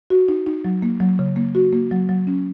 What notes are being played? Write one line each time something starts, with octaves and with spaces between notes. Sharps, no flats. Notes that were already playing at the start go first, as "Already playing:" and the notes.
F#4
D#4
D#4
F#3
A#3
F#3
C#3
A#3
F#4
A#3
F#3
F#3
C#4